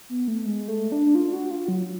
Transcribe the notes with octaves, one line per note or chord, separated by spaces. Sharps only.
B3
A3
G#3
A3
D4
F4
F#4
F4
F#3